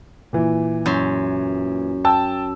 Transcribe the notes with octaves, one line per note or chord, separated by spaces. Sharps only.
A#2 E3
F#2 C6
G5 A5 E6